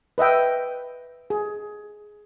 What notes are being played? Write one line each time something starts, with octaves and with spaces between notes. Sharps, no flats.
B4 D#5 E5 G5
G#4